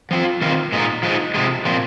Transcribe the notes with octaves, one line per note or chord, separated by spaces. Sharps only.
F3 C4 F4
D#3 C4 F4
A#2 G#3 D#4
F3 G#3 D#4
C3 F3 G#3
A#2 F3 C4